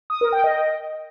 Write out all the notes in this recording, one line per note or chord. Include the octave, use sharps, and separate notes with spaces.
D#6
A#4
G5
D#5